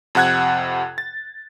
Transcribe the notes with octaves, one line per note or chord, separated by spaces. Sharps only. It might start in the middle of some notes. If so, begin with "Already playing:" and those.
F2 C3 F#5 F#6 G#6
A6